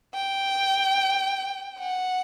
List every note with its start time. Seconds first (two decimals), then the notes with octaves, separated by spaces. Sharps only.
0.14 G5
1.79 F#5